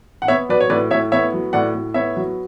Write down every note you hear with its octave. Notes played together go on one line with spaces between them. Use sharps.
F#5
B3 C#5 E5
F#3 B4 D5
C#5
A2 B4 D5
A2 C#5 E5
B3 C#5 E5
F#3
A2 D5 F#5
A2
B3 C#5 E5
F#3